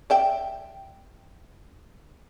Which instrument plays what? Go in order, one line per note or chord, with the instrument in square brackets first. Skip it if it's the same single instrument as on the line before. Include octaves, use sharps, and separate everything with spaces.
[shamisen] D5 E5 G5